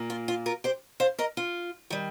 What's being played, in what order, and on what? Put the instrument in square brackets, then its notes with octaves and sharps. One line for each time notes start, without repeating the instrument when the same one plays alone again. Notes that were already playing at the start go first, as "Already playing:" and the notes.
Already playing: [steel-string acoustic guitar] A#2 A#3
F4
F4
F4 A#4
G4 C5
C5 F5
A#4 D#5
F4
D#3 G3